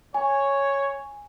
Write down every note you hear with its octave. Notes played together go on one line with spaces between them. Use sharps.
C#5 G#5